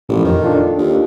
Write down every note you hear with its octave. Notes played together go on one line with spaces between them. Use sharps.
A1 A#2 F3
F2 D#3
D4 F4 A4
D#2